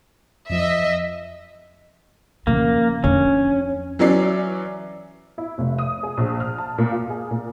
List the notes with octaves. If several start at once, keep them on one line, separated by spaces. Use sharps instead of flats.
F2 F3 D#5 E5
C#3 F3 A#3
F2 C#4 D4
E3 F#3 C#4 D5 C7
E4
F1
D#6
G#4
A#1
F6
A5
A#2
F4
G#4
A#2